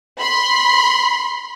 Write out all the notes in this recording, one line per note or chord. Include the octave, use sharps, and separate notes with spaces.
B5 C6